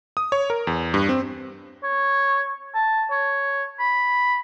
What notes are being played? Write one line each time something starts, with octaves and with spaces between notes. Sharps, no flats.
D#6
C#5
A#4
E2
G2
C4
C#5
A5
C#5
B5